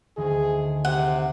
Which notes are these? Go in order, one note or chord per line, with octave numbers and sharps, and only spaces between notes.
D2 D#3 G#4
C3 F#5